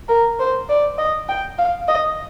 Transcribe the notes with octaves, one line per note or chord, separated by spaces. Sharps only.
A#4
C5
D5
D#5
G5
F5
D#5